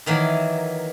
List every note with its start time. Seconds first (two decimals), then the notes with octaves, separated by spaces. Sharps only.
0.06 D#3 E3 F#3 A#3